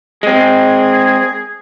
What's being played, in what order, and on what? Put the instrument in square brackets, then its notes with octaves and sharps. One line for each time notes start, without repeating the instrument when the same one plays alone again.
[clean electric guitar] G#3 C4 [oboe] G#4